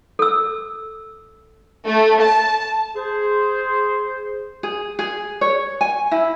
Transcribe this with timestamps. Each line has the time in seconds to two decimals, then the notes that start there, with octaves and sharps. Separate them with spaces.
0.19 A4 E6
1.85 A3
2.21 A5
2.96 G#4 C5
4.63 G#4
4.99 G#4
5.41 C#5
5.81 G#5
6.11 E4